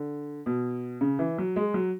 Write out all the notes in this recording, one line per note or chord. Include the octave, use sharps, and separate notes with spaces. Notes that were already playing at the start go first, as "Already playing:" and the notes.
Already playing: D3
B2
C#3
E3
F#3
G#3
F#3